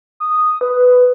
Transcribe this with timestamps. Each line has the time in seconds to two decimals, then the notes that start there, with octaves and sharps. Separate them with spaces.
0.20 D#6
0.61 B4